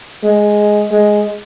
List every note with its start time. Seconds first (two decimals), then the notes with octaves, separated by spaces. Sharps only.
0.24 G#3
0.91 G#3